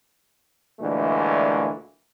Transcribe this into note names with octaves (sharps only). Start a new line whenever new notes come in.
D2 A#2 E3 G#3 A3